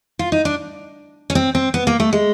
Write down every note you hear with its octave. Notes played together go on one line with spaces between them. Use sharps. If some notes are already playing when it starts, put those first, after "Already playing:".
F4
D#4
D4
C#4
C4
C4
B3
A#3
A3
G#3